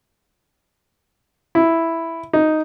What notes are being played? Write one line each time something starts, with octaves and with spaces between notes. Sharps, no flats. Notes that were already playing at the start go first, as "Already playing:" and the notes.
E4
D#4